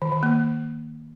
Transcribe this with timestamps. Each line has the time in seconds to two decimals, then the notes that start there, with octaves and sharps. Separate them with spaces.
0.02 D#3
0.12 D#3
0.23 A#3